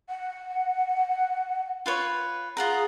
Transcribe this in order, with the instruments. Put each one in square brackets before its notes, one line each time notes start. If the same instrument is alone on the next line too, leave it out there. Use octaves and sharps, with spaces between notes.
[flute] F#5
[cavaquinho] F4 B4 C#5
[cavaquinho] F4 F#5 A#5 [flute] G#4